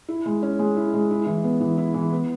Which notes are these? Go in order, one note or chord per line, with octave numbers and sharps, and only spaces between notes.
E4
G#3
C#4
G#3
E4
G#3
E4
E3
B3
E3
E4
E3
B3